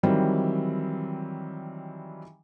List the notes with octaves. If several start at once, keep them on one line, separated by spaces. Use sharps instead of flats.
D#3 E3 F#3 G3 C4